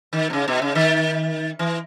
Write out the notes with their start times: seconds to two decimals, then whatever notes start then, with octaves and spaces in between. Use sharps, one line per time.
0.13 D#3
0.30 B2
0.33 C#3
0.48 B2
0.62 C#3
0.75 D#3
1.59 E3